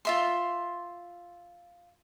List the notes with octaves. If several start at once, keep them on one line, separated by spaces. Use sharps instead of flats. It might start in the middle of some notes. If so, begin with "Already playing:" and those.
F4 E5 C6